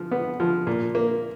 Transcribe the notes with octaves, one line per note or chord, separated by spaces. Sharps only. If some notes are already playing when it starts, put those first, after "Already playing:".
Already playing: F3
B3
F3
A#2
A#3